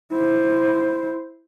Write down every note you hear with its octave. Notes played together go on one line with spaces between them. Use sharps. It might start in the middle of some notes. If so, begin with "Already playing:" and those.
E4 C5